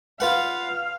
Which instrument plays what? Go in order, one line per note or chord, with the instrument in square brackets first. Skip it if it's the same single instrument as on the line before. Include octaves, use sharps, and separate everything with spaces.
[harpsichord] F4 B4 F#5 [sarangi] F5